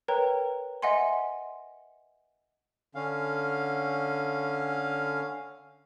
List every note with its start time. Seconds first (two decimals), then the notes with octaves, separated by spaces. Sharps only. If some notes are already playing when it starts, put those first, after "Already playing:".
0.08 A#4 B4 C#5 G5 A#5
0.82 D#5 E5 F#5 G#5 C6
2.95 D3 C#4 F5